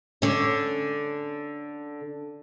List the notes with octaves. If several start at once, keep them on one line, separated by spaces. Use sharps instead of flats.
D3 C#4